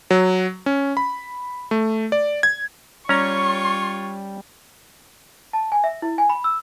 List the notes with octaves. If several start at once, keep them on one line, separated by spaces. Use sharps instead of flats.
F#3
C#4
B5
A3
D5
G#6
G3 C#4 F4 C#5 D5 A#5 C#6
A5
G#5
E5
E4
G#5
B5
E6